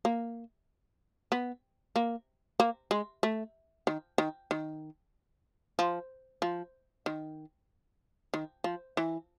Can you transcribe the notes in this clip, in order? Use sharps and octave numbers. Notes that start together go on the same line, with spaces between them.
A#3
B3
A#3
A#3
G#3
A3
D#3
D#3
D#3
F3
F3
D#3
D#3
F3
E3